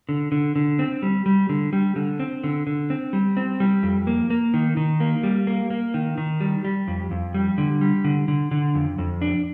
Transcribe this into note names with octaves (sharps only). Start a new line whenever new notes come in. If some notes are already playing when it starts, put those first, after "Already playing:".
D3
D3
D3
C4
G3
G3
D3
G3
D3
C4
D3
D3
C4
G3
C4
G3
F2
A#3
A#3
D#3
D#3
A#3
G3
A#3
A#3
D#3
D#3
G3
G3
F2
F2
G3
D3
G3
D3
D3
D3
F2
F2
D4